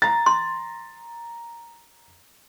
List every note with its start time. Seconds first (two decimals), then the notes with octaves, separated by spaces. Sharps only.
0.02 A#5 A6
0.26 C6